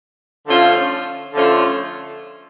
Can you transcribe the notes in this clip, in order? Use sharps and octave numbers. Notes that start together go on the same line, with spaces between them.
D3 F3 A3 C#4 F4
D3 F3 A3 C#4 F4